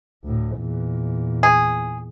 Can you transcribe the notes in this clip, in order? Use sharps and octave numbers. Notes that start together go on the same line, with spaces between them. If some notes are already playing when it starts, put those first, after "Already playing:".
D2 A2
E2 A#2
G#4